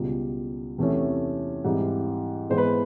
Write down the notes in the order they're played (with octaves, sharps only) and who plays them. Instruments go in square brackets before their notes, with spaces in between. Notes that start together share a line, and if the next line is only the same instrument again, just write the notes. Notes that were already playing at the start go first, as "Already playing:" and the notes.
Already playing: [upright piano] C#2 B2 G3
E2 C3 E3 A3 C#4
G#2 E3 G3 C4
G#2 E3 G#3 B3 C5
B4